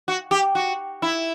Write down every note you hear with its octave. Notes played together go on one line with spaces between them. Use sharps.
F#4
G4
F#4
E4